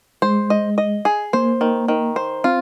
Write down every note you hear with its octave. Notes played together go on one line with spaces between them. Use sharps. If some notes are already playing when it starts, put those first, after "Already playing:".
G#3 C5
D#5
D#5
G#4
A#3 C5
D#3
D#3
C5
C4 F4